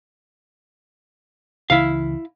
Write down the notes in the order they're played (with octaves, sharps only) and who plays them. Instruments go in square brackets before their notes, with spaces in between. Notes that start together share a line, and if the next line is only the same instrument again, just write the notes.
[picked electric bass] C#2 C#3 E3 [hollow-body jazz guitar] E4 F5